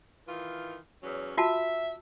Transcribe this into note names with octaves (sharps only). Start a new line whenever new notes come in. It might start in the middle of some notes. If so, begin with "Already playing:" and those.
D#3 E3 F4
E2 F#3 C#4
F4 F#4 E5 A5